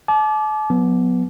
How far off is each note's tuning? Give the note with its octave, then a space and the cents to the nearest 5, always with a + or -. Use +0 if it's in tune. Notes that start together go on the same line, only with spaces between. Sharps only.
A5 -40 D6 +0
F#3 -35 B3 +0